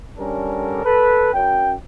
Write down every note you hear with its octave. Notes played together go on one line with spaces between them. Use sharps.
D3 G3 C#4 D4 A4 A#4
A4 B4
F#2 G5